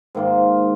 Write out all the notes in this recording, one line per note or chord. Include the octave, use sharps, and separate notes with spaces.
G#2 D#3 A#3 F4